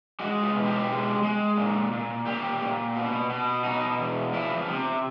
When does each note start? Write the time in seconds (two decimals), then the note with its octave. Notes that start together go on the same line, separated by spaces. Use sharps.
0.20 G#3 F#4
0.43 F4
0.54 B2
0.66 G4
0.89 G#3
1.23 G#3
1.57 A#2
1.92 A#2
2.26 A#2 G4
2.61 A#2
2.95 B2
3.30 B2
3.64 B2 D#4
3.99 E2
4.33 F3 E4
4.68 C3